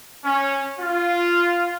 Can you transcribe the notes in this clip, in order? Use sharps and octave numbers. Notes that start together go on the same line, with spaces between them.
C#4
F4